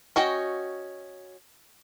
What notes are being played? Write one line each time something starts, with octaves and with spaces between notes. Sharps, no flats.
C#4 F#4 D#5 G5